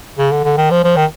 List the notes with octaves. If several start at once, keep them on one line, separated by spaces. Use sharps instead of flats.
C#3
D3
D3
D#3
F3
F3
D#3